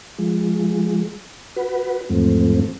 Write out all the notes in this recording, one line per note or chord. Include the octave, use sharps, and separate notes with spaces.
F3 G#3
F#4 B4
E2 G#2 F3 A3 C4